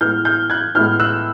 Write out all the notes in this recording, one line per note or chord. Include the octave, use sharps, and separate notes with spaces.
A2 E3 G#3 B3 F6 G6
F6 G6
F#6 G#6
A2 E3 G#3 B3 F6 G6
E6 F#6